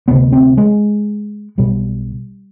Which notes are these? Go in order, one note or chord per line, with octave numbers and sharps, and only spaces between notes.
D2 C3 B3
C4
G#3
B1 B2 G3